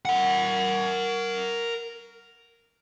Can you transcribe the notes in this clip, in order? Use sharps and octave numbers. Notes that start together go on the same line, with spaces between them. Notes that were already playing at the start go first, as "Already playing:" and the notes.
A#4 F#5